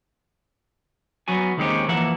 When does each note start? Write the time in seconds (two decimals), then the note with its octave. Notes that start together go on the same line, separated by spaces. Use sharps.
1.28 F#3 B3 F#4 G#5
1.57 D#2 D#3 G#3 C4 C#4 G4
1.88 E3 F3 A#3 E5 F#5